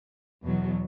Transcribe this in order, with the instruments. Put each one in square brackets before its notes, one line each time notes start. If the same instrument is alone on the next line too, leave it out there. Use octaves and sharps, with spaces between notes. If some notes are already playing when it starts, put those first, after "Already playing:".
[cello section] E2 B2 F#3